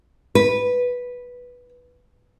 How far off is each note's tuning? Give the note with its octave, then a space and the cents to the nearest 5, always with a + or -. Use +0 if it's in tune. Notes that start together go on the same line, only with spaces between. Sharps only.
B4 -5